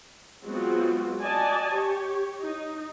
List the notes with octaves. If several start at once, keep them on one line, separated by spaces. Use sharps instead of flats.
F#3 G#3 B3 C4 F4 F#4
F#4 D5 D#5 G#5 A5
G4 C#5
D#4